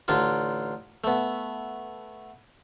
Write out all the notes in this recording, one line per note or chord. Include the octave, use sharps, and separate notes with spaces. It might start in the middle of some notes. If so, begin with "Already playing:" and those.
A1 D3 D4 D#4 F4
A3 B3